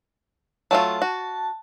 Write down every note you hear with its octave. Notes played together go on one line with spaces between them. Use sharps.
F#3 A3 F4 A5
F#4